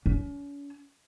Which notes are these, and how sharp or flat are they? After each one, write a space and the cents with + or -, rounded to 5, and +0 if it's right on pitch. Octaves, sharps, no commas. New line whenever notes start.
C#4 +40